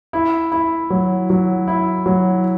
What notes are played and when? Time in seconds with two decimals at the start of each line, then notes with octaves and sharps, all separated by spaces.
0.13 E4
0.52 E4
0.90 F#3
1.30 F#3
1.68 E4
2.06 F#3